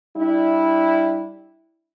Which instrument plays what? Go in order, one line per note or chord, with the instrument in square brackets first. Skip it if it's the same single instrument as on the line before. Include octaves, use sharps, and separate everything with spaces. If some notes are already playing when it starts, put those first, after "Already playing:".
[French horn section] G3 D4 E4